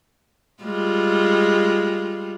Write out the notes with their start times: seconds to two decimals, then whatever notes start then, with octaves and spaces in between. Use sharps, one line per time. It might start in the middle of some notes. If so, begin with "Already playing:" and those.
0.63 G3 G#3 F4